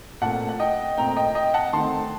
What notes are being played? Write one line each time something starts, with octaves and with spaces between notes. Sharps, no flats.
A#2 A3 C4 F#5 A5
F#5
D#5 G5
A#2 A3 C4 G5 A#5
D#5 G5
D#5 G5
F#5 A5
D#3 A3 C4 A5 C6